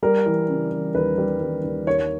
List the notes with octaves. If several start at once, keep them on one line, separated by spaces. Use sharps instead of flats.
G3 A#4
E3
C#3
E3
D#2 B4
G3
D#2
D#2
D#2 C#5